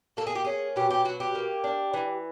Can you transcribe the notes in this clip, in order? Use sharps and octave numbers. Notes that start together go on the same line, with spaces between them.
A#3 A4
G#4
G4
C#4 G#4
B2 G4
G4
F#3 F#4
G4
A#3
D4
E3